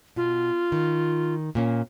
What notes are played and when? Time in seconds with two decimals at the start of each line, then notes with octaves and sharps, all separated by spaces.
0.16 B2 F4
0.72 D#3
1.55 A#2 A#3 C#4